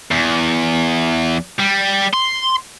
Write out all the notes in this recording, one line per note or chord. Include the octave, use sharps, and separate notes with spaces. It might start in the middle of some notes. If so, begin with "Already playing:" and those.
E2
G3
C6